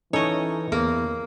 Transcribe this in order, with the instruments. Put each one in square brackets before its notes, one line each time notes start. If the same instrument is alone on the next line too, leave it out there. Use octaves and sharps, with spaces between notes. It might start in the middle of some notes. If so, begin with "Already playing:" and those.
[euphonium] E3 [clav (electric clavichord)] C#4 D#4 A4 [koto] C#5 D#5
[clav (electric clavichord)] E2 [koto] A#3